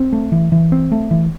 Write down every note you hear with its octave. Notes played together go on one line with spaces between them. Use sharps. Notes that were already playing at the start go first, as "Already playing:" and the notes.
Already playing: C4
A3
E3
E3
C4
A3
E3